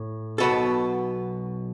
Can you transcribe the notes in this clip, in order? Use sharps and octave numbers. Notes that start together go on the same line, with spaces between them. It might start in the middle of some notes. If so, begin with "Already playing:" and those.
Already playing: A2
B1 B2 B3 F#4 A4